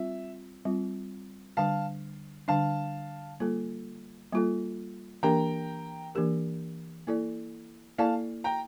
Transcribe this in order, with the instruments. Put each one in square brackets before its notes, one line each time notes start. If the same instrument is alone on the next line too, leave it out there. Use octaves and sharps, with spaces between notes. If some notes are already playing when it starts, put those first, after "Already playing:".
Already playing: [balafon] G3 C4 F4 [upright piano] E5
[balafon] G3 C4 F4
[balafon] D3 G3 D4 [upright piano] F5 A5
[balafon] D3 G3 D4 [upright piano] F5 A5
[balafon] G3 A#3 F4 A4
G3 A#3 F4 A4
[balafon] E3 A#3 D4 G4 A#4 [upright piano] G5 A#5
[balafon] E3 A#3 D4 G4 A#4
A#3 E4 A4 D5
[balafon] A#3 E4 A4 D5 [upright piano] F5 A5
[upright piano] G5 A#5